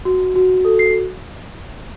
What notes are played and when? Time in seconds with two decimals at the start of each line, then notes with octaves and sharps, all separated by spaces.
0.05 F#4
0.36 F#4
0.65 A4
0.79 C7